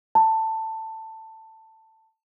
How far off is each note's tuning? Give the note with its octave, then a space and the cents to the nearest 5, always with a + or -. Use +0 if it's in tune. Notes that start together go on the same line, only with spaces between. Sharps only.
A5 +15